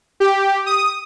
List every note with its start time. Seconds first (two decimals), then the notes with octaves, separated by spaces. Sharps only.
0.20 G4
0.66 D#6